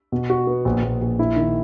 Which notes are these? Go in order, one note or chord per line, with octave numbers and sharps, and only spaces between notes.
B2
F#4
B3
A#1
A#1
A#1
E4
D#3